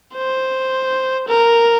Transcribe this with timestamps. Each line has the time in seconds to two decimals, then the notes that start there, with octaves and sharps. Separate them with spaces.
0.14 C5
1.29 A#4